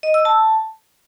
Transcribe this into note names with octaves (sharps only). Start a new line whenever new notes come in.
D#5
E6
A5